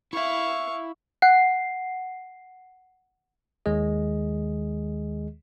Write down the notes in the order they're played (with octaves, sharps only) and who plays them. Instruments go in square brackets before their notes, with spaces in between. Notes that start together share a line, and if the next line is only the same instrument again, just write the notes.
[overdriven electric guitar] E4 E5 [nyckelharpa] F5 C#6
[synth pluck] F#5 C7
[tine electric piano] D#2 D#3 G#3 G#4 D#5